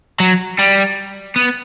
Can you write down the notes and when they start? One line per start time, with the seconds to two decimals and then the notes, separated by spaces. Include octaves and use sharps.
0.20 F#3
0.59 G3
1.36 B3